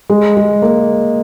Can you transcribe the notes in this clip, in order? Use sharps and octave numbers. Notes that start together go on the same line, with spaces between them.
G#3
G#3
A#3